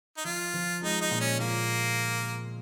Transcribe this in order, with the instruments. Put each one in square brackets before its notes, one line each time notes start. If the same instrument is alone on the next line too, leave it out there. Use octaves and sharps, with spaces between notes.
[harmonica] D#4
[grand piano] F3 [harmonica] F4
[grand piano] F3
[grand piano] G#3 [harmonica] D#4
[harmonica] D#4
[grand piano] A#2
[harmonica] C#4
[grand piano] A#2 [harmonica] A#3